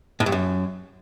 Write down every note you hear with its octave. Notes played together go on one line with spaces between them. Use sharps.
A2
G2
F#2